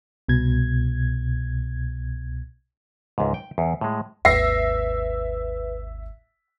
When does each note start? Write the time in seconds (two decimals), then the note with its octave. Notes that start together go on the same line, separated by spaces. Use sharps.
0.28 C2 B2 G#6
3.18 C#2 G#2
3.34 G5
3.58 E2
3.81 A2 G#3
4.25 G#1 D#2 B4 E5 A#6 C7